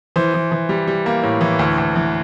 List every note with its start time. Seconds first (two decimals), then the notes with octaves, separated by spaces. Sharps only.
0.16 E3 C5
0.34 E3
0.51 E3
0.69 G3
0.87 G3
1.06 A#3
1.23 A2
1.41 E3
1.59 D2
1.78 D2
1.96 E3